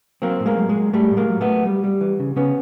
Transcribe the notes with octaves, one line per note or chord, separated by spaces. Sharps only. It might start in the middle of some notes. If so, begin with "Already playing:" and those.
F#3 A#3 C4
A2
G#3 A#3
F#3
G#3
F#3
A2 G3 A3
A2
G#3 A#3
F#3
A3 B3
F#3
G3
G3
E3
C#3
C#3 B3 C#4